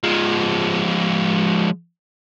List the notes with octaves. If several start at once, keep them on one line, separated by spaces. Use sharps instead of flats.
F3 G#3